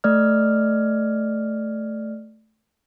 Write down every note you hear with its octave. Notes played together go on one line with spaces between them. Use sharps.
A3 D5 F6